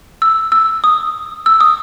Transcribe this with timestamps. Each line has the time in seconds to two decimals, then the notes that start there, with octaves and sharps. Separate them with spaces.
0.22 E6
0.52 E6
0.84 D#6
1.46 E6
1.61 D#6